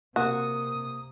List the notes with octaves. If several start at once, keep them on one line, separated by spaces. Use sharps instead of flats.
C3 A#3 F#4 D#6